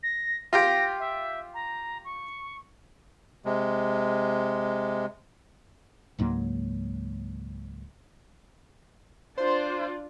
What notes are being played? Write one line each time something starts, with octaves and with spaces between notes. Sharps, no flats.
A#6
F4 G4 G5 A#6
E5
A#5
C#6
C3 G#3
C#2 G#2 F#3 A#3
D4 F4 C5